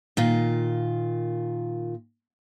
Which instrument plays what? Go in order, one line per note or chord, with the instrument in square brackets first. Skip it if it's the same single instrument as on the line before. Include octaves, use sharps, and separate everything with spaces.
[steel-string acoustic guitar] A#2 D#3 F4